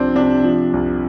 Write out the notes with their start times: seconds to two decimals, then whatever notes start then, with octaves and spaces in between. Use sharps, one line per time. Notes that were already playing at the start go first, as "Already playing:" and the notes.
Already playing: C2 F3 C4 D4
0.15 C3 D4
0.44 F3
0.73 C2